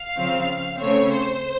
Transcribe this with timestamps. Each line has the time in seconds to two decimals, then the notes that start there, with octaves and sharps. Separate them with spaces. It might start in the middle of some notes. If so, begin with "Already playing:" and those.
Already playing: F5
0.15 C#3 F3 C4
0.79 C#3 A3 C4 C#5
1.12 C5